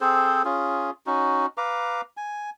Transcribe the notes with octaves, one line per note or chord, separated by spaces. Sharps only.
C4 G#4 A4 C5
C#4 F4 G#4
C#4 D#4 F#4
B4 F5 A#5 D6
G#5